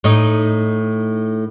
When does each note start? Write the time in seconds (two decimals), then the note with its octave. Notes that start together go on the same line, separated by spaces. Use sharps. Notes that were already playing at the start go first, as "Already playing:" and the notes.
0.04 A2 D#4